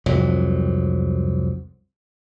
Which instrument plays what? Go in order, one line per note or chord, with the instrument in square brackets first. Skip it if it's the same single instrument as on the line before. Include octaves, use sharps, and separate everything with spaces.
[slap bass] C2 F2 G#2 F#3